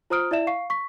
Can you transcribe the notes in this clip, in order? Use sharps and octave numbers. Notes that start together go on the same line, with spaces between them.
F4 C5 A#5 D#6 F6 D7
E4 D5 E5 E7
F5 C#6 C7
C#6 B6